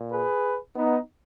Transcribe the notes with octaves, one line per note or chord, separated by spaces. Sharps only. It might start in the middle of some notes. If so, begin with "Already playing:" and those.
Already playing: A#2
G#4 B4
B3 D#4